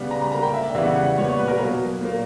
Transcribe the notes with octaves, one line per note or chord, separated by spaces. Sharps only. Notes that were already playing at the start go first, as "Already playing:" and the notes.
Already playing: C#3 G3 B3
A#5
B5
D3 A#3 A#5
G5
E5
D5
C#3 E3 G3 B3 E5
F#5
F#5
F#5
A#2 G3 B3 C#5
D5
B4
A#4
B2 F#3 A#3
A#2 A#3